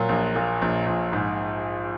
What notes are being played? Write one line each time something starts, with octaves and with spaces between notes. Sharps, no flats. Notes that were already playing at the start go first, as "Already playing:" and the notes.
Already playing: A#2 F#3
A#1
A#2
A#1
A#1
G#2